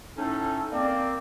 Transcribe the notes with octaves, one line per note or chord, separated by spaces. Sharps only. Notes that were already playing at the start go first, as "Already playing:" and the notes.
A2 C#4 D#4 A4
A#3 C4 D5